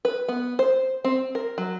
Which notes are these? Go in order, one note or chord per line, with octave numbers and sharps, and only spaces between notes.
B4
B3
C5
C4
A#4
F#3